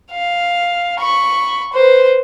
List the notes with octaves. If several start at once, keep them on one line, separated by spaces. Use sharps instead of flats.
F5
B5 C#6
B4 C5